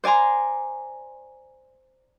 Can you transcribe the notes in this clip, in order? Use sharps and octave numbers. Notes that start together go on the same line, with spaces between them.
C5 D5 G#5 A#5 C6